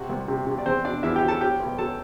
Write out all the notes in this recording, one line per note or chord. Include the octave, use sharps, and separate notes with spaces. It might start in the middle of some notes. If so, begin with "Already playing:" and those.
Already playing: C3 F#4
C2
C3
C3
D5
E2 C4 C5
B2 D4 D5
E2 E4 E5
G4 G5
F#3
A4 A5
F#3 G4 G5
B1
F#3 A4 A5